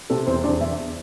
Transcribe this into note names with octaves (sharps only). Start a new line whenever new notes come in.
C3 A4
E2 C4 C5
E2 D4 D5
E2 E4 E5